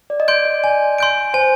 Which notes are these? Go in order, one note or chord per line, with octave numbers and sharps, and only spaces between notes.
D5
D#5
D5 C6 G6 D7
D5
G#5
C6 G6 D7
C5 G#5